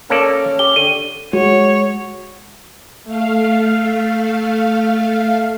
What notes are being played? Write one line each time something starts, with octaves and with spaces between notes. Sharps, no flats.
A#3 C#4 A4 D5
G4 G7
D3 D#7
G#3 F#4 C#5
A3 F5